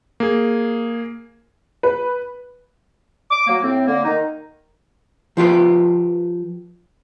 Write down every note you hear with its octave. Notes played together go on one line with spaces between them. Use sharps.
A#3 G#4
B4
D6
F#3 A#3
A2 C4
D3 A#3
D#3 D#4
F3 F4 G4 B4